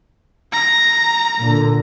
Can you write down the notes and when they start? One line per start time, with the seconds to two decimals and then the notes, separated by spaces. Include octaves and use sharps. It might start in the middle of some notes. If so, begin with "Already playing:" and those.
0.52 A#5
1.38 A#2 D3